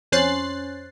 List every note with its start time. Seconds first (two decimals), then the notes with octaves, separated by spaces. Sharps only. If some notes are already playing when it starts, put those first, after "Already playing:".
0.12 F2 C#4 C5 F#6 A6 C7